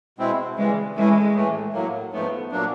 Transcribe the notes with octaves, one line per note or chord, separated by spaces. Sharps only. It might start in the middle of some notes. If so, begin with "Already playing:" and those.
B2 G#3 C4 E4
C#3 E3 G3 G#3
E3 G#3 A3 C#4 E4
A2 E3 A3
A2 F#3 A#3
G#2 F3 A3 B3
A#2 F#3 A#3 D4